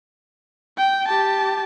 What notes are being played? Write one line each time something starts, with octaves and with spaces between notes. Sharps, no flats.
G5
G4 A5